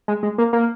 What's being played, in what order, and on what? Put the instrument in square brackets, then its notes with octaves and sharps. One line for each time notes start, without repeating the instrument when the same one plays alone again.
[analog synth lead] G#3
G#3
A#3
A#3